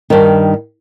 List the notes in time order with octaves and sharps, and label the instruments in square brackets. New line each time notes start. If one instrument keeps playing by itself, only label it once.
[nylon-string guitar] G2 D#3